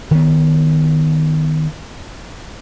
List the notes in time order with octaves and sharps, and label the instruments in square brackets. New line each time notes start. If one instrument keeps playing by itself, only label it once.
[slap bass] D#3 B3